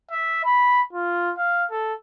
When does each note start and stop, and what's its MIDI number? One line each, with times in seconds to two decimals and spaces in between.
0.11 0.41 76
0.45 0.82 83
0.93 1.32 65
1.38 1.65 77
1.71 1.94 69